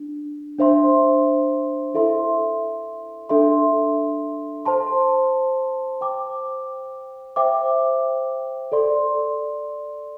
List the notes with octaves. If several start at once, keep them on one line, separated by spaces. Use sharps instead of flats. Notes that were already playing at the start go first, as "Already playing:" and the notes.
Already playing: D4
D4 C5 E5 C6
E4 A4 E5 C6
D4 A4 E5 C6
C5 A5 C6
C5 G5 D6
C5 E5 G5 D6
A4 D5 C6